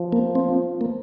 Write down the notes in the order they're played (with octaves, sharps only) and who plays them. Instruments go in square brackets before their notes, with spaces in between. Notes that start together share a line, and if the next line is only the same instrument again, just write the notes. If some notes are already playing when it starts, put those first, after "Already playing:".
Already playing: [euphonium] F3
[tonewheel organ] A#3
C4
A#3